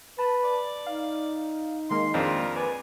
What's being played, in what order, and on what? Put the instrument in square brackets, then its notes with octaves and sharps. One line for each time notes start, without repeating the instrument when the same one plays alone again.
[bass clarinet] B4 [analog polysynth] A5
[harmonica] D5
[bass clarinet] D#4 [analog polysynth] F5
[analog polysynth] D#3 G#3 A#3 [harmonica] C6
[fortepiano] F2 C4 D4 [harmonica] F4 A#4
[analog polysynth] B4 D5 [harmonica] G#5